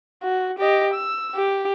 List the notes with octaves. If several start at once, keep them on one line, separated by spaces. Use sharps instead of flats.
F#4
G4 D#5
E6
G4